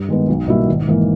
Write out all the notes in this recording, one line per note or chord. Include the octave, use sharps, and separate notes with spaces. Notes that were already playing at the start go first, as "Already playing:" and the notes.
Already playing: G2
D#3 G#3 B3
B1
B2 G3 A#3 E4
G#1
G#2 E3 A#3